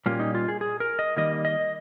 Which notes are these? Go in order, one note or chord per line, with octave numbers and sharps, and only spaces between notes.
A#2 G3 A#3 C#4 F4
D#4
F4
G#4
G#4
A#4
D#5
D#3 G3 A#3 D#5
D#5